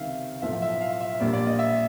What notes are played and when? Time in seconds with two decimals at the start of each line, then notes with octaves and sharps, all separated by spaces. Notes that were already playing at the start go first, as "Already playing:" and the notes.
Already playing: C#2 C3 D#3 E5 F5
0.42 B1 A2 F3 A3 E5
0.62 E5
0.81 F5
1.00 E5
1.20 A#1 A#2 G3 A#3 D5
1.33 D5
1.47 D#5
1.59 E5